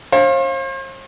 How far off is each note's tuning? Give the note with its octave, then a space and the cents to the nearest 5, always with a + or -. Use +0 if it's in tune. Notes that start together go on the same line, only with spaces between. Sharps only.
C5 +45 F5 +0